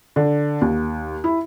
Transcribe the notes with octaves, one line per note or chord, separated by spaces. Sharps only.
D3
D#2
E4